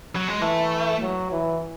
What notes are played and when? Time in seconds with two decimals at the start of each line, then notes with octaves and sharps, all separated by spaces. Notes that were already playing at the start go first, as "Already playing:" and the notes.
0.16 F#3
0.28 G#3
0.41 E3 A3
1.01 F#3
1.32 E3